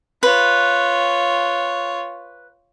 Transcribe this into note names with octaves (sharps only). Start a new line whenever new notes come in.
F4 B4 C#5